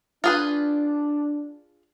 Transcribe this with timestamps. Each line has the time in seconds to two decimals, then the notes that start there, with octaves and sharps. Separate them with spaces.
0.24 D4 F4 G#4 B4